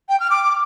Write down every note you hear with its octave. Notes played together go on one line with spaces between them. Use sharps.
G5
F6
D6